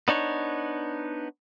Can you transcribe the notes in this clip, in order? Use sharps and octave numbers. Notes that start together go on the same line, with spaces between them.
B3 D4 D#4 C#5